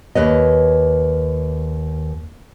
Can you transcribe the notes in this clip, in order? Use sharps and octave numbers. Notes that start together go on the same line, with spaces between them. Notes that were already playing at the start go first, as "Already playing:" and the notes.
D#2 B4 C#5 D#5